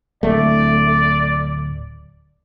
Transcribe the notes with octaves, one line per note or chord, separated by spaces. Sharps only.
D1 A3 D5